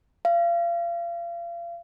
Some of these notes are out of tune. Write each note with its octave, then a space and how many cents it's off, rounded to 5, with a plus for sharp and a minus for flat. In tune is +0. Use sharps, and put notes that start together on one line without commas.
F5 -35